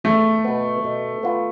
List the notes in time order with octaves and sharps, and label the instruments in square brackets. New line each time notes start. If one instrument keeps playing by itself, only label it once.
[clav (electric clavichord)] E2 [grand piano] A3
[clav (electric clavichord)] B2 B3
B2
B3 F4 B4